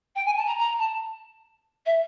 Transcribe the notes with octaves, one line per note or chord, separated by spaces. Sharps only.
G5
G#5
A5
A#5
A#5
A5
E5